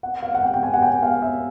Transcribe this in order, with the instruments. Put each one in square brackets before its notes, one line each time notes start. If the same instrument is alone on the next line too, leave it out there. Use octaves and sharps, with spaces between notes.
[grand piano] F#5
F5
F#5
G5
G5
G#5
F#5
G5
F5
E5